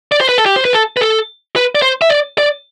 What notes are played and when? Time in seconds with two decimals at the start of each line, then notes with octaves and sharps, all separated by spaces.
0.12 D5
0.21 C5
0.29 B4
0.38 A4
0.46 G4
0.56 C5
0.65 B4
0.73 A4
0.97 B4
1.01 A4
1.56 B4
1.75 D5
1.82 C5
2.02 E5
2.10 D5
2.38 D5